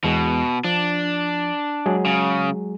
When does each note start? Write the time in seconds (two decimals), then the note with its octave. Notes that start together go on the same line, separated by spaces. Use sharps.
0.04 E2 B2 G#3
0.64 F3 D4
1.86 F#3 G#3 G#4
2.06 C#3